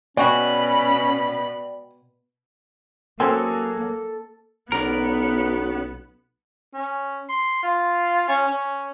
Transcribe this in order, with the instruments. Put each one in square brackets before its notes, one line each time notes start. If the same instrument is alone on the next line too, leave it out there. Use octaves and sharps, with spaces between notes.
[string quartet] B2 B5 [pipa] G#3 F#4 [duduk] C#4 [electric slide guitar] D5 G5
[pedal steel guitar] F#3 F#4 G#4 [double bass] A#3 [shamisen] C4 C#4 [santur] A4
[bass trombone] B1 [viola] B3 [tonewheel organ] C#4 F#4 [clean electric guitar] A#4 D5
[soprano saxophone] C#4
C6
F4
C#4
C#4